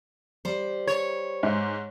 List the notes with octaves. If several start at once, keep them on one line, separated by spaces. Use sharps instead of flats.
G3 C5
C#5
G#2